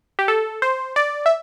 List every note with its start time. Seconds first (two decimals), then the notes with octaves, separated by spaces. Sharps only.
0.19 G4
0.28 A4
0.62 C5
0.96 D5
1.26 E5